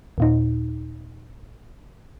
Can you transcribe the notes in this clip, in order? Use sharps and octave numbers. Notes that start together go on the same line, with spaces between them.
D#2 A#2 D#4